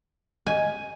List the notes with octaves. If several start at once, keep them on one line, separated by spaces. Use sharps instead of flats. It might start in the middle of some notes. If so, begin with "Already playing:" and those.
D#5 G#5